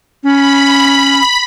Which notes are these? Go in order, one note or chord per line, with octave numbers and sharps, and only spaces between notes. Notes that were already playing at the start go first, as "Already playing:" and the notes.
C#4 B5